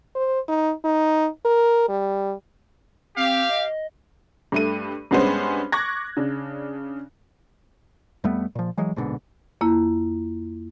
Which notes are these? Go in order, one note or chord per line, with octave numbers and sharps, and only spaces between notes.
C5
D#4
D#4
A#4
G3
C4 G4 F5
D#5
G2 A3 D#7
G2 G#3 B3 C#4 C5
C#6 D6 F#6 G#6 A#6
C#3 D4
F2 G3 A3 B3
A#2 F3
E3 F#3 G#3
A#1 G#2 B2 D3
F2 A#3 E4